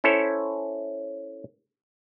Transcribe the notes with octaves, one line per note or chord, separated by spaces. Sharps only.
C#4 E4 A4 C5 C#5